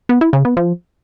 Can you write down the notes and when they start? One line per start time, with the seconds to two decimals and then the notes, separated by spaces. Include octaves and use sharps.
0.09 B3
0.21 E4
0.33 C#3
0.45 B3
0.57 F3